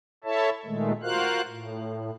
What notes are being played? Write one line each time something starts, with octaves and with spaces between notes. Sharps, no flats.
E4 A4 C#5 E5 A5
A#2 D#3 G#3 A3
F4 F#4 A#4 C5 F5 F#6
A2